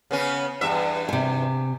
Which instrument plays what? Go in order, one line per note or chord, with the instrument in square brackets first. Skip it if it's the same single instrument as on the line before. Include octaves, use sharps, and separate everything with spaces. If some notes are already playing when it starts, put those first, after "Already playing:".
[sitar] C#3 B3 C#4
E2 G2 E5
[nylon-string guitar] C3 G#5